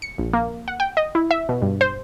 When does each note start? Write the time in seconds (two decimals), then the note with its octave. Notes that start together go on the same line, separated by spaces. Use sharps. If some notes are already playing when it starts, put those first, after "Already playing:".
0.02 C#7
0.18 A#1
0.33 A#3
0.68 F#5
0.80 G5
0.97 D#5
1.15 E4
1.31 E5
1.49 B2
1.62 G2
1.81 C5